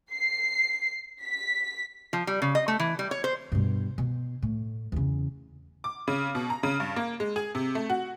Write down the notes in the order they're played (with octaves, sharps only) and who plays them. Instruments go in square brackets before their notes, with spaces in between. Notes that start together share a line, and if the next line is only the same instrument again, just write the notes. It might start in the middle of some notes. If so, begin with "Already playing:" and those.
[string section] C7
B6
[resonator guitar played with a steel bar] F3
G3
C#3
D#5
A3
E3
G3
C#5
C5
[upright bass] G2 B2
B2
A2
E2 C#3
[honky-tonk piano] D6
C#3
B2
A#5
C#3
G2
A#3
G#3
G#4
C3
A3
F#4